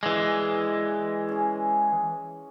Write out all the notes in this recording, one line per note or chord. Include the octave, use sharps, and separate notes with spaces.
E3 G#3 D5
C#4 G#4